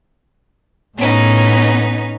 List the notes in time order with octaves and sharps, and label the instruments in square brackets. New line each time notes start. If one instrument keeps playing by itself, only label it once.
[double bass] A2 [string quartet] B3 C#4 D#4